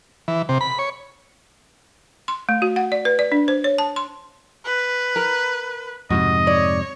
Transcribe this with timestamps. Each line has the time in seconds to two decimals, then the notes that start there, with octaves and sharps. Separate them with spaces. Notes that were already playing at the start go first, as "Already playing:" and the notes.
0.28 E3
0.49 C3
0.61 B5
0.79 C#5
2.28 C6
2.49 A3
2.62 F#4
2.76 F#5
2.92 D5
3.05 B4
3.19 D5
3.32 D4
3.48 C5
3.64 C#5
3.78 A5
3.96 C6
4.65 B4
5.16 A#4
6.10 F2 G#2 C3 F#4 D#5
6.47 C#5 D5